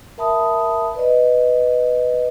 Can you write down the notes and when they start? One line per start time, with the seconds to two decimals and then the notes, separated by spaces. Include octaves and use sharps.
0.18 A#4 E5 A5 B5 D#6
0.95 B4 D5 D#5